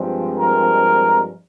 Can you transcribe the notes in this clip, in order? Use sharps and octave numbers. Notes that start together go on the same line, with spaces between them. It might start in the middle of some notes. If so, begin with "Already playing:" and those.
Already playing: G2 F3 G#3 C4
A#4